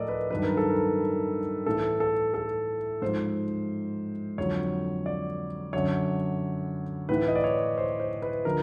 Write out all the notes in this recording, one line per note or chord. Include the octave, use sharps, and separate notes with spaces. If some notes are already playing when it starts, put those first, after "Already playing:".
Already playing: A2 F3 A4 A#4 D5 D#5
B4
G2 D#3 F#3 B4
A#4
A4
A#4
A2 E3 A4
A4
A4
G#2 F3 C5
F2 D3 F#3 C#5
D5
F#2 D3 F#3 C#5
A2 E3 B4
D#5
D5
C#5
C5
C5
B4
D3 F3 A#4